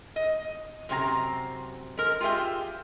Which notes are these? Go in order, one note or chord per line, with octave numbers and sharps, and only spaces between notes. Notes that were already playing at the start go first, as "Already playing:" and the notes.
D#5
F#2 C3 C4 G#5 A#5
G#3 A#4
F4 G4 G#4 E5 G5